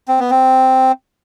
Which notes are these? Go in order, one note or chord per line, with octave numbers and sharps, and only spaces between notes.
C4
B3
C4